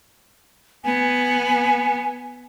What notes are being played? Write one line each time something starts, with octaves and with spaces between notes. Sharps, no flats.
B3 G#5